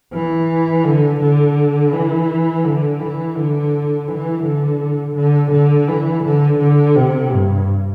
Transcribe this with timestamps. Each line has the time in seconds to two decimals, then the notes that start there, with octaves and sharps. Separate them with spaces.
0.13 E3
0.84 D3
1.21 D3
1.93 E3
2.64 D3
3.00 E3
3.36 D3
4.08 E3
4.44 D3
5.16 D3
5.52 D3
5.88 E3
6.24 D3
6.59 D3
6.96 C3
7.32 G2